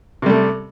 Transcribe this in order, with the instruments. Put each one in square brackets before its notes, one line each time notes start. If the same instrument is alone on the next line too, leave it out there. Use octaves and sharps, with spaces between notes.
[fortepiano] C3
G3
A3